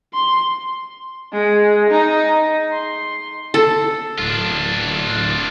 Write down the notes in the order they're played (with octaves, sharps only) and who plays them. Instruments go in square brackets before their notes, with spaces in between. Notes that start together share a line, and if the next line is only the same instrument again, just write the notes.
[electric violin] C6
[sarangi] G#3
D#4
C6
[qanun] A4
[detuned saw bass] D1 [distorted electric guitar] D4 F4